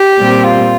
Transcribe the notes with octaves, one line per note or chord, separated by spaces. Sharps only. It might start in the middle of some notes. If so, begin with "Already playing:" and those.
Already playing: G4
A#2 G3 C4
F4